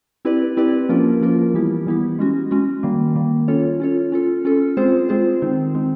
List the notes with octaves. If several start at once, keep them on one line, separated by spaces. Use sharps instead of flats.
C4 E4 G4 B4 D5
C4 E4 G4 B4 D5
F3 A#3 C#4 F4 A#4
F3 A#3 C#4 F4 A#4
E3 G3 B3 E4 G4
E3 G3 B3 E4 G4
G#3 C#4 F#4
G#3 C#4 F#4
D#3 G3 A#3
D#3 G3 A#3
C#4 F4 A4 C#5
C#4 F4 A4 C#5
C#4 F4 A4
C#4 F4 A4
G#3 C4 F4 G#4 C5
G#3 C4 F4 G#4 C5
D#3 G#3 C4 D#4
D#3 G#3 C4 D#4